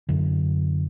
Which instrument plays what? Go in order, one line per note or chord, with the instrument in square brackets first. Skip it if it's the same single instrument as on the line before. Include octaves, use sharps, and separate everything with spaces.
[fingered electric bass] F#2 D3